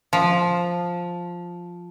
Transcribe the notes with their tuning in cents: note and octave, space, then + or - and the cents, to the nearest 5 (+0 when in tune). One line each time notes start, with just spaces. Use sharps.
F3 +5